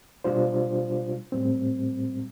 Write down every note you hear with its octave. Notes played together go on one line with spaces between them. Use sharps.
B2 G3 D4 F4 C5
A2 G3 C4